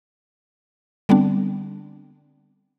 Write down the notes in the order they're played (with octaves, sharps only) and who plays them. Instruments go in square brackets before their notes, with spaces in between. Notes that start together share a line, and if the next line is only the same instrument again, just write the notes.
[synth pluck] D3 G3 B3 C4 D4